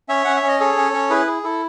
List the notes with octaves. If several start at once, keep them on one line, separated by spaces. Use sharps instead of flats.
C#4 C#5 E5
C#4 F#5
E5
C#4
D#5
G#4 A4 C#5
C#4
C#4
E4 G#4 B4
G#4
E4 A4